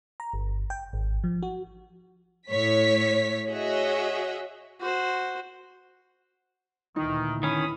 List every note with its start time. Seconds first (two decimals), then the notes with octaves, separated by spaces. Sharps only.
0.20 A#5
0.33 G1
0.70 G5
0.93 G#1
1.24 F3
1.43 F#4
2.48 A2 C#5 B6
3.50 F#4 G#4 C#5 D#5 E5
4.80 F#4 C5
6.96 D2 A#2 D#3 E3 D#4
7.43 D#3 C#4 B5 D#6